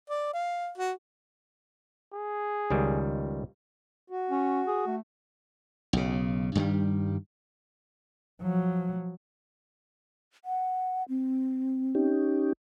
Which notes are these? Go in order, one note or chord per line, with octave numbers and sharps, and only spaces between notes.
D5
F5
F#4
G#4
C#2 D#3 G3
F#4
C#4
G#4
A3
B1 C#3
G2 D#3 G3
F3 F#3
F#5
C4
C#4 D#4 G4